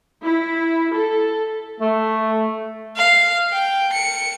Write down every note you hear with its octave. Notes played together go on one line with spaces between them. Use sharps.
E4
A4
A3
F5
G5
C#7